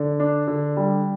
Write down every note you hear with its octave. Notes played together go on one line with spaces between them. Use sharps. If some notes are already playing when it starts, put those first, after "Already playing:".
Already playing: D3
D4
D3
G3